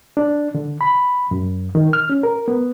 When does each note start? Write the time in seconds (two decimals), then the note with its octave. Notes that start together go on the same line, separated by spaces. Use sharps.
0.17 D4
0.55 D3
0.81 B5
1.31 F#2
1.75 D#3
1.93 F6
2.10 C#4
2.23 A#4
2.48 B3